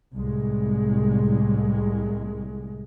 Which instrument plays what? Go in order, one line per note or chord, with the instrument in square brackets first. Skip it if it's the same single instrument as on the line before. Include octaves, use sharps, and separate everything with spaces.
[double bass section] C2 A2 G#3